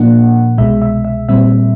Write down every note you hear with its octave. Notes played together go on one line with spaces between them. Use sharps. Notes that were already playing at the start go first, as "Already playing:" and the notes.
Already playing: A#2 F3 A#3 D4 F#5
C2 B2 G#3 E5
E5
E5
A#2 G3 C4 E5